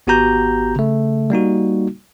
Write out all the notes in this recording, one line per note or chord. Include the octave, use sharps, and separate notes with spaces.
G#1 B3 F#4 G4 A#5 G6
C#3 A3
G3 A#3 D#4 F#4